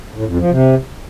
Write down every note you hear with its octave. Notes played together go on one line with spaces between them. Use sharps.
A2
F2
F3
C3